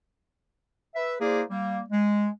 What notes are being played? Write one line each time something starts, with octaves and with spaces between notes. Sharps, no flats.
B4 E5
A#3 E4 G#4 C5 D5
G3 A#3
G#3